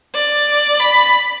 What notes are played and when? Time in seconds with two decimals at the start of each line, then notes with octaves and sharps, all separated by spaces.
0.15 D5
0.80 B5